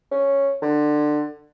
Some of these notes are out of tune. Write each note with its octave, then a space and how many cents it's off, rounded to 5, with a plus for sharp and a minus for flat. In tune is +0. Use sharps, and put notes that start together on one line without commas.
C#4 -5
D3 +25